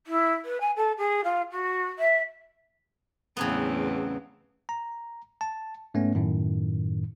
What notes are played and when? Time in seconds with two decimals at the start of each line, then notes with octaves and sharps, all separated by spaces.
0.06 E4
0.45 B4
0.60 G#5
0.76 A4
0.97 G#4
1.24 F4
1.51 F#4
1.98 E5
3.37 E2 A2 C#3 F#3 B3 C4
4.69 A#5
5.41 A5
5.94 G#2 A3 B3 C#4
6.15 F#2 A2 D#3